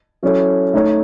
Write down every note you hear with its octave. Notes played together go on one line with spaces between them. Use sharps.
F#3 C#4 E4 A4 C#5
A3 D#4 A4 C#5